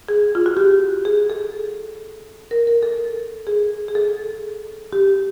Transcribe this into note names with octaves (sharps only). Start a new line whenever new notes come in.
G#4
F4
F#4
G4
G#4
A4
A#4
A#4
A4
G#4
G#4
A4
G4